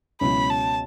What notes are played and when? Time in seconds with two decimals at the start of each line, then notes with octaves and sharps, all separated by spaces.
0.21 C#2 B2 F#3 C#4 E4 B5
0.50 A5